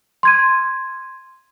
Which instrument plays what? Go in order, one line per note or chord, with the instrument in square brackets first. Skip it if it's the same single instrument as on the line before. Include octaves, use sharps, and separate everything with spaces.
[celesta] C6 G#6 D#7